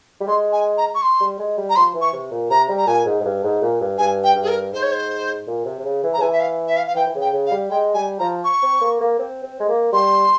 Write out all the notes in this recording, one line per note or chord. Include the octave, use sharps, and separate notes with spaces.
G3
G#3 C6
G#5
A#5
C#6
C6
G3
G#3
G3
A#5
F3 C6
E3
C#6
C3
A#2
C3 A#5
G3
A#5
A#2 G#5
G#2
G#2
G2
G#2
A#2
G2
G2 G#5
G5
G2
G#4
A#4
G#2 C5
C#5
C5
A#2
C3
C3
C#3
E3
A#5
C#3
E3 G#5
E5
F5
E5
F5
F5
E3 G5
E3
C#3
G5
C#3
F5
G3
G#3 G5
G3 G#5
F3 A#5
C#6
C4
A#3
A#3
C4
C4
G#3
A#3
G3 C6